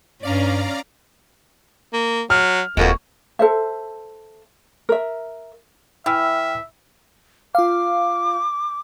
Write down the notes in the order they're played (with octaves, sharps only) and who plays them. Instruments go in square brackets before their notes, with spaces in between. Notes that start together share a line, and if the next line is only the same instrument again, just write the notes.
[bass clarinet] G2 [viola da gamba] C#4 [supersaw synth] D5 F5 A#5
[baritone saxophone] A#3
[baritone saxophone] F#3 [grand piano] F6
[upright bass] D#1 [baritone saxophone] F2 [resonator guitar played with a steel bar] G#3 A#3 F#4
[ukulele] A4 C5 E5
A#4 E5
[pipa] E3 [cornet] E5 [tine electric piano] G5 E6 F6
[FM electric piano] F4 F5 [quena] D6